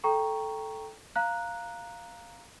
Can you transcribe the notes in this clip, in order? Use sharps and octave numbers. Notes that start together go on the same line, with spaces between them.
A4 G5 A#5 C#6
F5 A#5 F#6